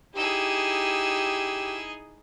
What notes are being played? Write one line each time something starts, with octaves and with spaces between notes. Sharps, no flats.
D#4 E4 G4 G#4 E6